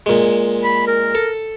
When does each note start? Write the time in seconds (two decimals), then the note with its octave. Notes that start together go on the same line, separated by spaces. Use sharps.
0.06 A#2 G#3
0.64 B5
0.87 A#4
1.15 A4